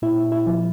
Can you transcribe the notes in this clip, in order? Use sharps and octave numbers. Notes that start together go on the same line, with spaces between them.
A#2 E4
E4
F3